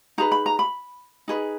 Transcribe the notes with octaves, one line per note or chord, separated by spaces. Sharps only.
D#4 G#4 B4 A#5
B5
A#5
B5
D#4 G#4 B4